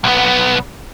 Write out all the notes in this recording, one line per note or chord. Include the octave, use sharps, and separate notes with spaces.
B1 B3